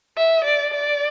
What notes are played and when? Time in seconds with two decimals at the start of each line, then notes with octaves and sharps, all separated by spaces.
0.17 E5
0.45 D5
0.74 D5